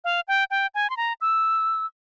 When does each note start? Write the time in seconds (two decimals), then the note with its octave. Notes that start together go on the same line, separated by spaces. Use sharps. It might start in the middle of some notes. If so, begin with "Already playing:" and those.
0.04 F5
0.28 G5
0.51 G5
0.75 G#5
0.90 C6
0.97 A#5
1.21 E6